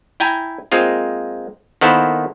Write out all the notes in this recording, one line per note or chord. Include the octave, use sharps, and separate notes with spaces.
E4 G5 G#5 A#5
G#3 A#3 C4 F4
D#3 A#3 B3 E4 A4 C5